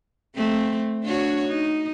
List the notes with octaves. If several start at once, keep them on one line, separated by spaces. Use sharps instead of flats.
A3 C4
D4 F#4 C#5
D#4